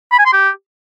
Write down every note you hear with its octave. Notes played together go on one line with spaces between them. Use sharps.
B5
G#5
C6
G4